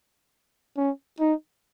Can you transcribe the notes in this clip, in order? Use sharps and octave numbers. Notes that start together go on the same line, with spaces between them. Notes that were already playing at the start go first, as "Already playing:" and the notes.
C#4
D#4